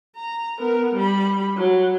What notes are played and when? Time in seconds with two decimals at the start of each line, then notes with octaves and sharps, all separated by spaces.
0.16 A#5
0.59 B3 A#4
0.95 G3 B5
1.56 F#3